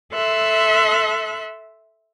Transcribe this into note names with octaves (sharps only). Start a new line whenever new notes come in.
A4 E5 C6 F#6